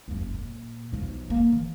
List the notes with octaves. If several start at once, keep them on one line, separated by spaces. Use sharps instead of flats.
F#1 F#2
A#2
B1 F3
A#3
E3